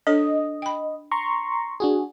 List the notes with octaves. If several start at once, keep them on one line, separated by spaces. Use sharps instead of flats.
D4 A4 C#5 D#5
G5 B5
A#5 C6 C#6
D4 F#4 G#4